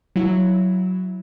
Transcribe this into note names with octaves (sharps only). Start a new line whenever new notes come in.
F#3 E4